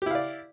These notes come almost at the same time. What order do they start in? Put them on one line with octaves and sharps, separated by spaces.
G4 E4 F5 D5